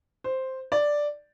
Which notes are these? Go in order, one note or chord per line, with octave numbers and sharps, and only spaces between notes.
C5
D5